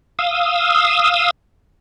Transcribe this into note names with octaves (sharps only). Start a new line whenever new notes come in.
F5 D#6 E6